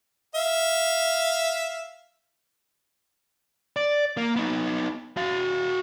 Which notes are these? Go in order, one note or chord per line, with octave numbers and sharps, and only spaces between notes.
E5 F5
D5
A#3
B3 D#4
F#4 F5